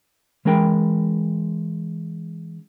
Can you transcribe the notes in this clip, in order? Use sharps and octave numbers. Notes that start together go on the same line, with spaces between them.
E3 G#3 C#4 A#4 G5 B5